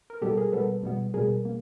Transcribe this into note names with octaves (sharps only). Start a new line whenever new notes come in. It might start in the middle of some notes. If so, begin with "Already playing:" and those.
A#4
B2 G3 B3 G4 A4
G#4 A#4
B2 G3 B3 A4 B4
B2 G3 B3
B2 G3 B3 G#4 A#4
A#3